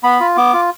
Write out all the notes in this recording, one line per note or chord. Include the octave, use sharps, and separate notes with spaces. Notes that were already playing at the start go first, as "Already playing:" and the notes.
B3 B5
F4
B3 D6
F4